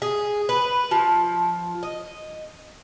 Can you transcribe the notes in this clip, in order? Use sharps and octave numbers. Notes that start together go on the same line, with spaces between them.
G#4
B4
F3
D#5